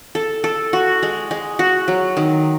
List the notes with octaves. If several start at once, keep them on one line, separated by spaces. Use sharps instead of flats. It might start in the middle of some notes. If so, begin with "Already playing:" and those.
A4
A4
F#4
G#3
G#3
F#4
F#3
D#3